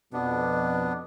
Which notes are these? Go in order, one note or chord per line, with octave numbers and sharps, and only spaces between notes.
F2 B2 B3 D4